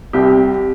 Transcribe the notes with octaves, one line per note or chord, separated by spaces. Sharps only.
C2 G4